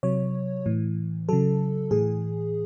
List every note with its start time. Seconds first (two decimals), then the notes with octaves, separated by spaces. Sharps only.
0.03 C3 F#3 C#5
0.66 A2 E3
1.29 C#3 F#3 A4
1.91 A2 E3 G#4